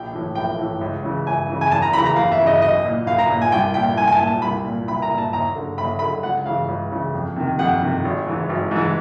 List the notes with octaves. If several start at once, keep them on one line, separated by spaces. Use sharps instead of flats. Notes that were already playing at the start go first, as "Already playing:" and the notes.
Already playing: A#1 G5
A2 E3
A#1 G5
A2 E3
C#2
C#3 E3
C#2 G#5
C#3 E3
G#5
E2 A5
A#5
C#3 E3 B5
A#5
E2 F5
E5
C#3
E3 D#5
B1 D#5
A#2
B1 F5
A#5
A#2
G#5
C2 G5
A#2 G5
C2 G#5
G#5
A5
A#2
A5
C2 B5
A#2
C2 B5
A#5
A#2
A5
D#2 A#5
D3
D#2 B5
D3 B5
C#2 F#5
C#3 E3 F5
C#2
C#3 E3
F2
C3 D#3
F2 F#5
C3 D#3
G#1
G#2 E3
G#1
G#2 E3